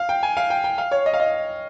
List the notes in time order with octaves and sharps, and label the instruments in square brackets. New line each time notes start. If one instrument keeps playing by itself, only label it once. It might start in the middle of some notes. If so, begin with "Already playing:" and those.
Already playing: [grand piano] F5
G5
G#5
F5
G5
G5
F5
C#5
D#5
F5
D#5